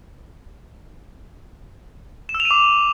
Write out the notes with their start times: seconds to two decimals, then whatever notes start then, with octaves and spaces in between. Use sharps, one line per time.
2.29 E7
2.34 E6
2.40 F7
2.45 D#7
2.51 D6